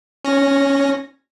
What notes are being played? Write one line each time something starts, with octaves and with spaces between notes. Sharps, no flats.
C#4 A#6